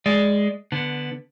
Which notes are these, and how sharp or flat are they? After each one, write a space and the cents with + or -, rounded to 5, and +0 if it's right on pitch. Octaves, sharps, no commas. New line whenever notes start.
G#3 +0 D5 +0
D3 +0 B3 +0